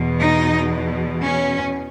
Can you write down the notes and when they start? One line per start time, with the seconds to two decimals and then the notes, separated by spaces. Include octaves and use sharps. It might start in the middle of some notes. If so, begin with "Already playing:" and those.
Already playing: E2 B2
0.19 D#4
1.23 C#4